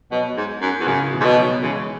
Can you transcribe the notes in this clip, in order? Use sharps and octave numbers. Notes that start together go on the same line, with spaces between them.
B2 F#3 B3
G#2
F#2
E2
F#2 C#3 F#3
B2 E3
G#2
B2
F#3 B3
C#3 E3 G#3